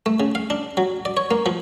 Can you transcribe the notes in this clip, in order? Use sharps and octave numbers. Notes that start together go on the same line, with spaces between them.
A3
C#3
F5
D4
F#3
D5
C#5
A#3
F3